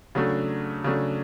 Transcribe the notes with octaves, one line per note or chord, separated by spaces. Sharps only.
C#3 F#3 A3 D4
C#3 F#3 A3 D4